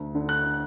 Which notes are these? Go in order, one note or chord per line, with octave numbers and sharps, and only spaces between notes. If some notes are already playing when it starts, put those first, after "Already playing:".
Already playing: D2
D3
F#6